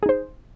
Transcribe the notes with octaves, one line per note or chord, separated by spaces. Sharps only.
D#4 G#4 C5